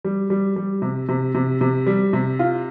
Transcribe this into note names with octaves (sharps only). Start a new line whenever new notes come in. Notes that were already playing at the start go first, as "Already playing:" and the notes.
G3
G3
G3
C3
C3
C3
C3
G3
C3
F4